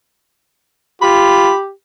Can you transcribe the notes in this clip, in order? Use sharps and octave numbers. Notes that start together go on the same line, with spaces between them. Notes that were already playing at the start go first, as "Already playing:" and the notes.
F4 G4 B5